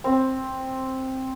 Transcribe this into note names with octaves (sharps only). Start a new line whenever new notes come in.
C4